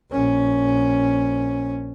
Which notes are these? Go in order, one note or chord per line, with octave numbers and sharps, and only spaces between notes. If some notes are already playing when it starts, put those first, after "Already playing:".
A#1 C#4